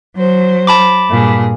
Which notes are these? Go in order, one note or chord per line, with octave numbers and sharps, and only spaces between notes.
F#3 C5
A5 B5 D6
G2 A#2 G#4